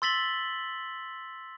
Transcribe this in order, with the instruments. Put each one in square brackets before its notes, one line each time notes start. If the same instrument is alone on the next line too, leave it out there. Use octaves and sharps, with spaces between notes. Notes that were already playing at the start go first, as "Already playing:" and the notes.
[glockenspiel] C6 E6 A6 B6 F#7 G7